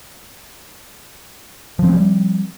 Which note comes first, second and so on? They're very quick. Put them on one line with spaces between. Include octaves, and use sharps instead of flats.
F3 C4 G#3 G3